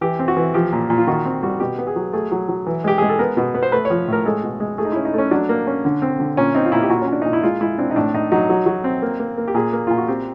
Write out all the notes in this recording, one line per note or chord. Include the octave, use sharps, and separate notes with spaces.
E3 G4
C4
F#4
E3
F3 G4
A#2
A#2
F4
D#3 F#4
C4
G3 F#4
B2 G4
B3
G#4
F#3
A3 G#4
F#3
F#3
E3
G#3 G4
G#3 G#4
A4
B3 A#4
B2
B3
C5
A3 B4
C#5
F3
A2 A#4
G#3 A4
B2
G#3
A3 G#4
D#4
C#4 E4
D#4
A3 C#4
F#3 D4
A#3
C#4
D3
C4
D3
A#2 C#4
C4 D#4
F4
A#2 E4
G4
A#2 F#4
C#4
A#2
D4
A#2 D#4
E4
G#3 F4
G#3 E4
C4 D4
D#4
A2 D4
A2 D#4
F#3 D#4
F#3
F#3
C4
A#3
A#3
A#3
G4
A#2 G#4
A#3
A#2 F4
F#4
C4 G4